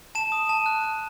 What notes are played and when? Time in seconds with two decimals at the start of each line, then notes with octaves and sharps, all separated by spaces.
0.15 A5 E7
0.32 D#6
0.49 A5
0.66 F#6
0.84 A5